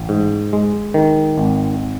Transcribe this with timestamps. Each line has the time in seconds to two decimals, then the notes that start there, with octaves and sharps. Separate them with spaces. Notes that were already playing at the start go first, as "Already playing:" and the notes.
Already playing: A1
0.09 G#2
0.53 G#3
0.94 D#3
1.38 G#1